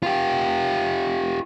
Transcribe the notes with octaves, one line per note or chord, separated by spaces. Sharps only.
F4 G4